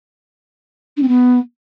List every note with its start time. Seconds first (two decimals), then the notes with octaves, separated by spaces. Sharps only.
0.97 D4
1.02 C4
1.08 B3